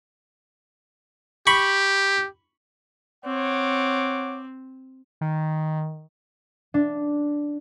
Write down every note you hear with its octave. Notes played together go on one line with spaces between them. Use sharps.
G4 B5 C#6
C4 C#5 F#5 D6
D#3
D4